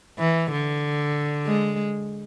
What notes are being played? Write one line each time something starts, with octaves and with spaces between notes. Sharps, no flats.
E3
D3
G#3